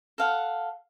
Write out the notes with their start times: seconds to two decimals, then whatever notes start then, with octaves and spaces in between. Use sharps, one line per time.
0.18 A4 F5 F#5